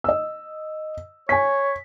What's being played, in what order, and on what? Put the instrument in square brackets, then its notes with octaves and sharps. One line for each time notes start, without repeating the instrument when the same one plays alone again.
[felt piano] D#5 E6
[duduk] C#5 [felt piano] G#5 B6